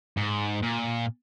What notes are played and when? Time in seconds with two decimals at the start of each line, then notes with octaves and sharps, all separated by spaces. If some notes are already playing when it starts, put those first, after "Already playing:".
0.17 G#2
0.63 A#2